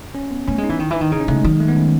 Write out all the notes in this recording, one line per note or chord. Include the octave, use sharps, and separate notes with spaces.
C#4
B3
A3 C#4
G#3
D#4
E3
D#3 E4
E3
D#3 D#4
C#3 D#4
C#4
C#3 A3
G#3
D#3 F#3
G#3
A3
B3
C#4